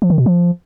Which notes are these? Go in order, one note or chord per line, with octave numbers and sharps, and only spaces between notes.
F3
D#3
B2
F3